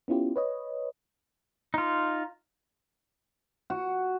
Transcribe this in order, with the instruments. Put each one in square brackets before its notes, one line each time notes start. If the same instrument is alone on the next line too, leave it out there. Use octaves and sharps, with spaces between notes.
[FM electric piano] B3 C#4 E4 F4 G4
B4 C#5 D#5
[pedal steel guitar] D#4 F4
[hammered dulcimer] F#4